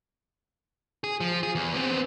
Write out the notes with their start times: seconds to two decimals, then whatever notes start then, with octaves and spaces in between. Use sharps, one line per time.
1.04 G#4
1.20 F3
1.43 G#4
1.55 E2
1.74 B3 C4